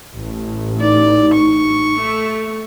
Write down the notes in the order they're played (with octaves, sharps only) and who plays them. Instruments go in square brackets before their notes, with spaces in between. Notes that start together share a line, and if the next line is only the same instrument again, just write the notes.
[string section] A1
[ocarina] D#4 [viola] D5
[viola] C#6
[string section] A3